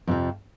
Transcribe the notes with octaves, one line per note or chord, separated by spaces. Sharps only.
F2 C3 F3